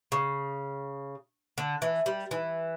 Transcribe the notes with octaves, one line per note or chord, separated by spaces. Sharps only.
C#3
D3
E3
G3
E3